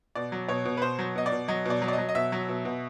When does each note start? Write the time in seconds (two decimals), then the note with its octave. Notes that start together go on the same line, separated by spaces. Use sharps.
0.15 B2 D5
0.32 F#3
0.48 B2 C#5
0.65 B2
0.77 B4
0.82 B2 C5
0.99 F#3
1.15 B2 D#5
1.26 D5
1.32 B2
1.48 F#3 D#5
1.65 B2 D5
1.82 F#3
1.88 D5
1.93 D#5
1.98 F#3
2.09 D#5
2.15 B2 E5
2.32 F#3
2.48 B2
2.65 B2